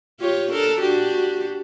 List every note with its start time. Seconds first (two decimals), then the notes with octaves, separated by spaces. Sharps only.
0.20 F4 G4 C#5
0.52 D4 A4 A#4
0.81 D4 F#4 G4